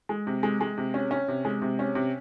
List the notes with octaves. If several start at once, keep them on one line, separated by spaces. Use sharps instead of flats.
G#3
C3
G#3
G#3
C3
C#4
C#4
C3
G#3
C3
C#4
C3